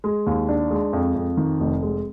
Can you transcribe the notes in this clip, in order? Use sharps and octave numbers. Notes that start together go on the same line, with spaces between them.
G#3
D#2
D4
G#3
F2
F2
D#3
F1
G#3